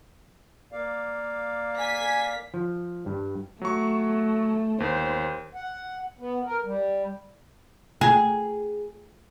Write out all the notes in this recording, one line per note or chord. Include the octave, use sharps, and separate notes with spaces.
A#3 D5 F5
G#5 B6
F3
G2
F#3 A3 C#6
D#2 C5
F#5
B3
A#4
G3
G#4